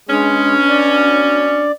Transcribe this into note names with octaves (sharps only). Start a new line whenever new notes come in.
B2 G#3 C#4 D4 G#4
D5